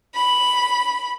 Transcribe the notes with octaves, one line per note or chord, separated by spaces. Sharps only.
B5